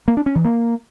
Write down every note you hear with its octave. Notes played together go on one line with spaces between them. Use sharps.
A#3
D4
C#4
E3
A#3